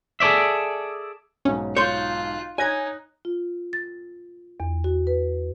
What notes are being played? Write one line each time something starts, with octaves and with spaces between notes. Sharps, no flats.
G#4 A4 C#5 D5 E5
B1 G#2 C#4
F4 C#5 C6 F#6 G6
D#4 C#5 G#5 F#6 G#6 A#6
F4
A6
E2
F#4
B4